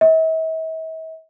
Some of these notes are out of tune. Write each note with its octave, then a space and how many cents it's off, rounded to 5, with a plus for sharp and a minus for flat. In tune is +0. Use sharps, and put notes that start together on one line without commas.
E5 -45